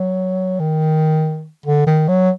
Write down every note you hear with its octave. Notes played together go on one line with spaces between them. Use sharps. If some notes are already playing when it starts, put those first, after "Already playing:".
Already playing: F#3
D#3
D3
D#3
F#3